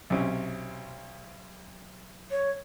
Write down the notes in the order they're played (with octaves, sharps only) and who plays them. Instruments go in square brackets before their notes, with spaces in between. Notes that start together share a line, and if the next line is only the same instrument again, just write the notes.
[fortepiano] B1 C3 C#4
[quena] C#5